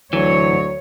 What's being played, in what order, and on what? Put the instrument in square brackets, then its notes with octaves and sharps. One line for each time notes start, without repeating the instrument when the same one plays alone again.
[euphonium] D2 [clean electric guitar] E3 [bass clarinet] F#3 [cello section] C#5